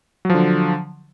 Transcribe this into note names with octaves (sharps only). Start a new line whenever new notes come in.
D3 F3 F#3